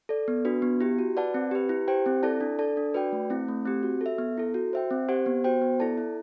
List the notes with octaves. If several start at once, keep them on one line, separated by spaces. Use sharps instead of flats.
A4 D5
B3
D4 F#4 B4
B3
E4 G4
F#4
B4 D5 F#5 A5
C4
G4 B4
E4
G4 C5 G5
C4
E4 A4 D5 A5
D4
A4 D5 A5
D4
F#4 B4 D5 G5
A3
C4 E4
A3
C4 G4
F#4
A4 E5
B3
E4 A4
F#4
C5 E5 G5
C4
G4 C5 F#5
B3
F#4 C5 G5
B3
E4 A4 D5 A5
E4